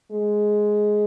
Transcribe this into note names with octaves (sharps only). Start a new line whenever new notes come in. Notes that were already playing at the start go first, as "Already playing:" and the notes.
G#3